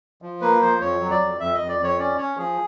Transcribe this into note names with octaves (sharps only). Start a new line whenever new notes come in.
F3
A#3 B4
F3 C5
F2 C#5
F#3
D5
F2
F2 E5
D#5
F2
D5
F2
C#5
C#4 D5
C#4 C#5
F3 G#4